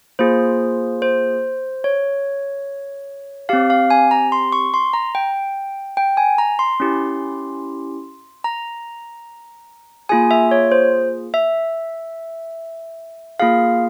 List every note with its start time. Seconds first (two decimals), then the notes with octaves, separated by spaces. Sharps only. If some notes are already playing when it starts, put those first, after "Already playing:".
0.19 A#3 F4 G#4 C5
1.02 C5
1.84 C#5
3.49 C4 G4 F5
3.70 F5
3.90 G#5
4.11 A#5
4.32 C6
4.52 C#6
4.74 C6
4.93 A#5
5.15 G5
5.97 G5
6.17 G#5
6.38 A#5
6.59 C6
6.80 C#4 E4 G4
8.44 A#5
10.09 A#3 F4 G#4 G#5
10.31 E5
10.51 C#5
10.72 C5
11.34 E5
13.40 A#3 F4 G#4 F5